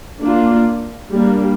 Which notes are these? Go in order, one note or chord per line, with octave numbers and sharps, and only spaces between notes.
A#3 D4 F4
G3 A#3 D4